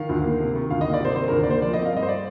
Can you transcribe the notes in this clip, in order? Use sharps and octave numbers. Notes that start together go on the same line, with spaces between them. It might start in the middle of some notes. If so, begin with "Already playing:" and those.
Already playing: D#3 F5
D2
A#3
C3
D#3
D2 F5
D#5
A#3
D5
C3 C5
D#3 C5
A#4
D2
D5
A#3 C5
F3 D5
D#5
C4
F5
G2 D#5
C5
D5